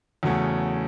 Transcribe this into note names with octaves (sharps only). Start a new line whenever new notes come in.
E2 C#3 F#3 A3 C#4